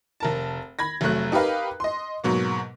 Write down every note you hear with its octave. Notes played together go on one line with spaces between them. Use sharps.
F1 A#4 A5
B5 G#6 A#6
F1 F#3 A3 F#6
D#4 G4 A#4 B4 F5
D#5 C6
G#2 B2 F#3 A#3